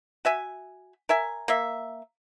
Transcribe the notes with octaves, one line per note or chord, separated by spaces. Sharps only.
F#4 E5 G#5
A#4 E5 G#5
A#3 E5